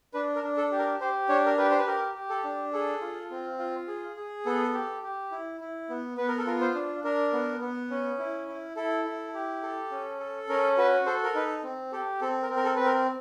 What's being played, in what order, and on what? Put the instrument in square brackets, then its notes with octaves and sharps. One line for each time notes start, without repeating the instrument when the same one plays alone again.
[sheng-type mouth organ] D4 B4
A#4
D4
A4
G4
A#4
G4 C5
D4 C#5
A#4
G4 B4
C5
B4
G4 A#4
G4
A4
D4
G#4 A4
F4
C4
F4
G#4
G#4
B3 A4
G4
G4
E4
E4
B3
B3 B4
A#4
A4
F4 A#4
C5
D4
D4 A#4
B3
B3
C#4
E4
E4
E4 A4
E4
G4
A4
C#4
A4
C#4 A#4
F#4 B4
A4 C5
A#4
D#4 B4
C4
G4 A4
C4 A4
A#4
C4
A#4
A4
C4 B4
A#4